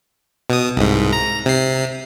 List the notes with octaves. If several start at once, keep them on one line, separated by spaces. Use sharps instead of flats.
B2 D#6
C2 G#2
A#5
C3 C7